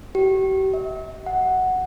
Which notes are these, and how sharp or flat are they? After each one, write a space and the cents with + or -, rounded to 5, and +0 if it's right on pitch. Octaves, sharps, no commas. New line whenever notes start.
G4 -40
E5 -40
F#5 +0